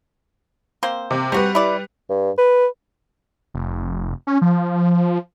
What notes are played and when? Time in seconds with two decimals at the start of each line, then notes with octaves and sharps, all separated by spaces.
0.83 A#3 C4 C5
1.11 C3
1.32 G3 C4 F#4 B4
1.55 E4 D5
2.09 G2
2.38 B4
3.54 F1
4.27 C#4
4.42 F3